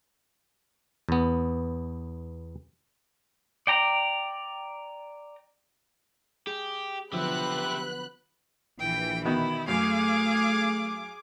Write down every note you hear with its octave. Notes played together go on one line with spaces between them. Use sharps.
E2 B3
D5 G5 A#5
G4 G#4
D3 F3 F#3 B3 G4 E5 B5 F#6
A#1 E3 G5
B2 D#3 B3 E4
F#2 A3 G#4 F5 D6